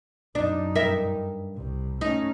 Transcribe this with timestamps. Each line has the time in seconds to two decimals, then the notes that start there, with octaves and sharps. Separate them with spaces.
0.35 F#2 D4 D#4
0.75 G2 A#4 E5
1.54 C2 C3
2.01 A3 C#4 D#4